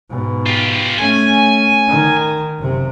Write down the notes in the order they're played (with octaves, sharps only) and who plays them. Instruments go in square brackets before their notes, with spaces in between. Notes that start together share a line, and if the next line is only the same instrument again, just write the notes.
[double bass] G#2 B2
[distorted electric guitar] F4 G4
[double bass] A3 C#4 [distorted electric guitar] G#5
[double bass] D#3
F#1 C3